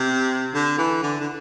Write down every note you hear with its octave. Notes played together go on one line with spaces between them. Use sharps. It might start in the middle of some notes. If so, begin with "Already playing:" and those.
Already playing: C3
D3
E3
D3
D3